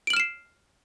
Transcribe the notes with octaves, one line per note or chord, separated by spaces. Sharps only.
F6 C7 D7 E7 F#7